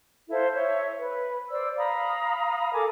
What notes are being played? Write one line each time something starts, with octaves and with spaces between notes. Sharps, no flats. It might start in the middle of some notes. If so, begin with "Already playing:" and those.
E4 A4 C5 F5
C#5 E5
B4
C5 D5 E6
F5 A#5 B5 D#6
A4 A#4 G#5 D6